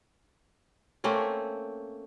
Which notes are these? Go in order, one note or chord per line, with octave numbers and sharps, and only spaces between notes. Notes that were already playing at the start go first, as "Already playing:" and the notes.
A3 A#3 C4 C#4